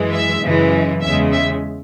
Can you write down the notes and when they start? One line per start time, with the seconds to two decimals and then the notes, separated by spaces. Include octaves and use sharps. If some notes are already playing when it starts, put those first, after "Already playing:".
Already playing: F#2 E3 G#3
0.13 E5
0.42 F#2 C#3 E3 G#3
1.02 E2 C#3 G#3 E5
1.33 E5